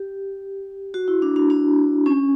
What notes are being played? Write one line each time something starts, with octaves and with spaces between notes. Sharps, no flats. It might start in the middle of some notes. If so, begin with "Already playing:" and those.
Already playing: G4
F#4
E4
D4
D4
D4
C#4